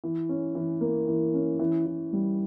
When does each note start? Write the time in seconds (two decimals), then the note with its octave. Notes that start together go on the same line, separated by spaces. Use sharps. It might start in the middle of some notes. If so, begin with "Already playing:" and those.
0.04 E3
0.29 C#4
0.55 E3
0.81 A#3
1.07 E3
1.34 C#4
1.60 E3
1.86 E3
2.13 G3